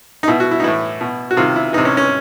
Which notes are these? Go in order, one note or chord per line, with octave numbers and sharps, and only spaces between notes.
D#4
B2 E4
F#4
E4
D#4
A2 E3 E4
B2
F#4
C3 D#3 F4
E4
C3 E3 D#4
C#4
C#4